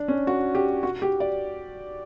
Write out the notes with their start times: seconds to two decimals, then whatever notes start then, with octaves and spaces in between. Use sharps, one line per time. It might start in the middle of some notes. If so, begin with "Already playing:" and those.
Already playing: D4
0.08 C#4
0.27 F#4
0.55 G4
0.83 F#4
1.02 G4
1.20 D5